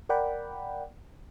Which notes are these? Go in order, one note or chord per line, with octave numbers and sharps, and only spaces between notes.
A#4 D5 F#5 G5 B5